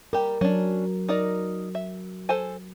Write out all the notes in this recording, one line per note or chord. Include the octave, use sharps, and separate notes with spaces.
G3 G4 A#4
F#3 C#4 D4
D#4 A#4 D5
E5
A4 C5 G#5